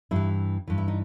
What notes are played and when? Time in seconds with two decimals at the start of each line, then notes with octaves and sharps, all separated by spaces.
0.11 G2 E3 E4
0.68 G2 E3
0.78 E4
0.88 D#4